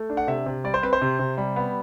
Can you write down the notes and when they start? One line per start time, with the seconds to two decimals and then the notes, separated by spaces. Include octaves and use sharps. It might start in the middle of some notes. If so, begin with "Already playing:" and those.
Already playing: A3
0.10 D4
0.17 F#5
0.27 C3 E5
0.46 C3
0.64 G3 D5
0.74 C5
0.83 C4 B4
0.93 C5
1.02 C3
1.19 C3
1.37 G3
1.56 B3